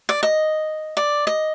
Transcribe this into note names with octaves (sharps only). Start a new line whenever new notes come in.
D5
D#5
D5
D#5